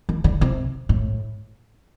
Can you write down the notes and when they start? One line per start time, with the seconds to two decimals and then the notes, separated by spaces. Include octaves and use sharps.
0.09 D#3
0.24 D3
0.41 C3
0.89 A2